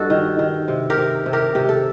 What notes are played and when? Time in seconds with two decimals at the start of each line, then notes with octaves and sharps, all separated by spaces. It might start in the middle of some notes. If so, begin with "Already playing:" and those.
Already playing: G2 D#4 F#4 A4
0.10 D#3
0.39 D#3
0.68 C3
0.90 G4 A#4
0.97 C3
1.26 C3
1.33 G4 A#4
1.55 C3 G4
1.69 A4